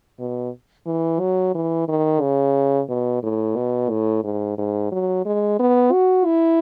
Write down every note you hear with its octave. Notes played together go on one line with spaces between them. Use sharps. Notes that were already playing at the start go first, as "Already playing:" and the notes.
B2
E3
F#3
E3
D#3
C#3
B2
A2
B2
A2
G#2
G#2
F#3
G#3
B3
F#4
E4